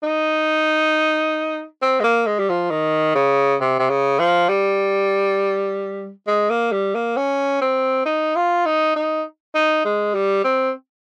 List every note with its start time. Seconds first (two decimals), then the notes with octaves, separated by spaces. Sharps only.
0.03 D#4
1.82 C4
2.00 G#3
2.03 A#3
2.26 G#3
2.39 G3
2.49 F3
2.70 D#3
3.15 C#3
3.61 C3
3.79 C3
3.89 C#3
4.19 F3
4.49 G3
6.27 G#3
6.50 A#3
6.72 G3
6.95 A#3
7.17 C#4
7.61 C4
8.05 D#4
8.36 F4
8.65 D#4
8.96 D#4
9.54 D#4
9.85 G#3
10.14 G3
10.44 C4